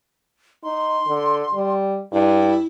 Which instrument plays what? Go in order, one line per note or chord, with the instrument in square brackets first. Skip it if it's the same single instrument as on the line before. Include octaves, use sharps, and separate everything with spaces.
[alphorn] D#4 [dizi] C6
[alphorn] D3
G3
[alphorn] G2 [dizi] E4